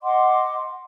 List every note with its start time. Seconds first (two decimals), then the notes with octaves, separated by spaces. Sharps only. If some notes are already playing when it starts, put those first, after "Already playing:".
0.03 D#5 F#5 C6 D6